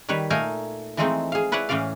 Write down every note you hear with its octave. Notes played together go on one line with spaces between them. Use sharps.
D#3 G3 B4 C#5
A#2 A3 D#4 A#4 F5 G#5
E3 F3 G#3 A3 C4 D#4
G#4 F5
E4 B4 C#5 D5 F#5
A2 E3 C#4 D5 F5